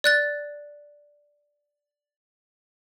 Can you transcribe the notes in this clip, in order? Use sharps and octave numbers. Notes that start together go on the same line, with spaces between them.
D5 F#6 A6